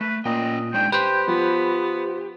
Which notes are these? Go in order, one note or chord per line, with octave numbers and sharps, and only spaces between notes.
A3 B4
A#2 C#4 D#5 G5
G#3 D4 D#4 G5
G4 B4 C5 G5
F3 B3